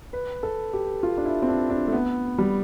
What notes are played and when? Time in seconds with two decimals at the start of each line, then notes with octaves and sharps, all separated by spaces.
0.13 B4
0.43 A4
0.73 G4
1.03 F4
1.18 D4
1.25 E4
1.42 C4
1.48 D4
1.70 D4
1.87 A3
1.92 B3
2.38 G3